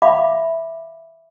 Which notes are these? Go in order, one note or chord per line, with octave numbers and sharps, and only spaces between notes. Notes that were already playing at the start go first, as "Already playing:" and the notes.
E5 F5 B5 D6